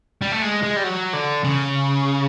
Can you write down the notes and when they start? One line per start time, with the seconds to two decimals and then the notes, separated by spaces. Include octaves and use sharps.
0.22 G3
0.32 A3
0.42 G#3
0.63 G#3
0.77 G3
0.84 F#3
1.13 D3
1.44 C#3